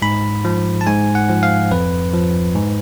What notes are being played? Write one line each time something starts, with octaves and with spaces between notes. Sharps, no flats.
G#2 B5
F3
A5
G#2 G#5
F#5
F3
F5
F2 B4
F3
G#2